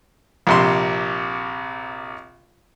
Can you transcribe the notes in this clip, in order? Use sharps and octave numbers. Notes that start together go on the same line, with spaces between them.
A#1 C3 C6